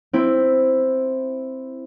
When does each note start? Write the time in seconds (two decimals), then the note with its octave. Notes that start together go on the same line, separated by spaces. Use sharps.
0.13 C4 E4